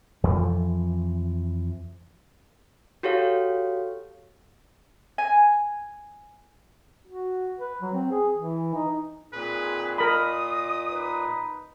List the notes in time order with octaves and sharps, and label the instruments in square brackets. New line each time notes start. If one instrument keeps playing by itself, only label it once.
[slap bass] F2 E3 F3
[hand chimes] F#4 G4 A4 C#5 F5
[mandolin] G#5
[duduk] F#4
B4
F#3
C4
G#4
E3
D#4
[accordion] A#2 [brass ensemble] C4 D#4 G#4 [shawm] B4
[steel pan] A#4 B5 [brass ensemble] D#5 [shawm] D#6
[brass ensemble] D#4 B4